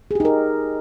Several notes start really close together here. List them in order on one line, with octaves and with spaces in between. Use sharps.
G#4 G4 D#4 A#4